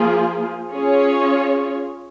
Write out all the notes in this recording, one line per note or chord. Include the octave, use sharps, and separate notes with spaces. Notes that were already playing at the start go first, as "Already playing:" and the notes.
Already playing: F3 A#3 F4 G#4
C#4 F4 G#4 C#5